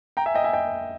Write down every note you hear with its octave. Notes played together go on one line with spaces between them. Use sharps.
G5 A#5
E5 G#5
D#5 G5
E5 G#5
D#5 G5